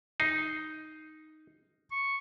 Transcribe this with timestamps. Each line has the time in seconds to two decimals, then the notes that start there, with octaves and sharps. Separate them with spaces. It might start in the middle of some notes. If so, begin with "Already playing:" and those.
0.20 D#4 C7
1.92 C#6